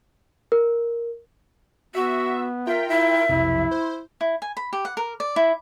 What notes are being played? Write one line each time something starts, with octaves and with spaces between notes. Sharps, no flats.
A#4
B3 F#4 E5
F4 A#4 E5 G5
E4 E5
B1 F2 C3 E4
C5
E4
G#5
B5
G4
F#5
A#4
D5
E4